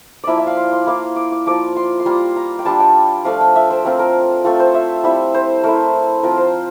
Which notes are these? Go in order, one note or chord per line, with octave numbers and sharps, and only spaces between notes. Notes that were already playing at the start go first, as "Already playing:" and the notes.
F3 A#3 E4 D5 E5
E5
F5
C6
C6
A#3 E4 D6
D6
D6
F3 A#3 F4 D6
C6
C6
G3 A#3 F4 A#5
A#5
G5
G3 D4 F4 A5
G5
F3 A3 D4 F5
G5
E5
C5
A3 C4 F4 A#4
A#4
A3 C4 F4 A4
C5
E5
G3 C4 E4 E5
C5
A3 E4 A#4
F3 C4 F4 A#4
C5